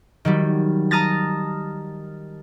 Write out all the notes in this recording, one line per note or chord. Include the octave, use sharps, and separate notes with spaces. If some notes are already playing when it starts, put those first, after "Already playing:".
D#3 F#3 G3
A5 A#5 D#6 F6 A6 A#6